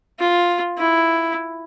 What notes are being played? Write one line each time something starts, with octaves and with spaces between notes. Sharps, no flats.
F4
E4